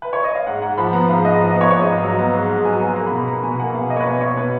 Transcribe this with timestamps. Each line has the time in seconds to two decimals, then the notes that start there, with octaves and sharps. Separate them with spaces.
0.02 B4
0.13 C#5
0.24 D#5
0.35 F5
0.47 G#2 F#5
0.62 G#2 F#5
0.77 F3 B5
0.93 B3 A#5
1.09 G#2 F5
1.24 G#2 D#5
1.40 F3 F5
1.50 D#5
1.56 B3 C#5
1.71 G#2 C#5
1.82 D#5
1.87 G#2 F5
2.02 F#3
2.19 B3
2.33 G#2
2.49 G#2
2.65 F#3 G#5
2.80 B3
2.96 A#3 A#5
3.07 B5
3.11 B2
3.17 B5
3.27 A#3 A#5
3.43 B2 G#5
3.59 A#3 F#5
3.74 B2 F5
3.90 A#3 D#5
3.97 C#5
4.00 B4
4.06 B2 D#5
4.21 B2 C#5
4.37 B2 B4